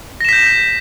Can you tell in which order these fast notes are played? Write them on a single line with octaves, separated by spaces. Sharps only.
A#6 E7 B6 G6